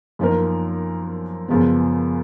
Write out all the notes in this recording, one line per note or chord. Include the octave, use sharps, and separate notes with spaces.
F#2 F3 A#3 D#4 A#4
F#2 C#3 F3 G#3 B3